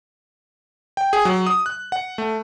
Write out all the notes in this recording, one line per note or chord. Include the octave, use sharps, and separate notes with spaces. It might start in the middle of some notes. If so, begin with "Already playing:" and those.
G5
G#4
F#3
D#6
F#6
F#5
A3